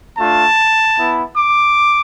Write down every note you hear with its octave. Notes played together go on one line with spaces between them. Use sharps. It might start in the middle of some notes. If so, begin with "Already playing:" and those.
A3 D4 F4 A5
B3 E4
D6